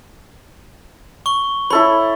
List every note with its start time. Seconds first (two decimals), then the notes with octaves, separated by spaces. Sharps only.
1.26 C#6 G7
1.70 E4 A4 C#5 B5